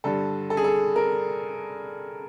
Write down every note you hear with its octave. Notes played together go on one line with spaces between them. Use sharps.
G2 D3 A4
A4
G#4
A4
A#4